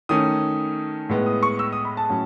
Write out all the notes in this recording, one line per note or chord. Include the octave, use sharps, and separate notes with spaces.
D#3 A3 C#4 D#6
A2 G#3 B3
D#6
C#6
E6
D#6
B5
A5
A2 F#3 C#4